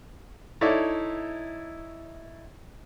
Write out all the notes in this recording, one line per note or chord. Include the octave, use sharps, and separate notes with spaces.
D#4 E4 A4 C#5 D5 E5